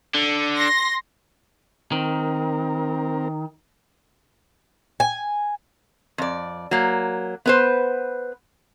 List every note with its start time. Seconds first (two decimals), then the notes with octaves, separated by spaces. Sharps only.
0.15 D3
0.57 C6 A#6
1.92 D#3 C4 A#4
5.00 G#5
6.18 F2 D5
6.71 F#3 A#3
7.46 B3 B4 C5